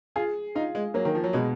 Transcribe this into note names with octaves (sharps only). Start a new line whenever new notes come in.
F4 G#4
D#4 F4
G#3
F#3 A#3
D#3
F3
F#3
B2 G#3